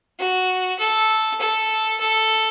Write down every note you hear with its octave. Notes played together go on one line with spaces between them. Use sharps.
F#4
A4
A4
A4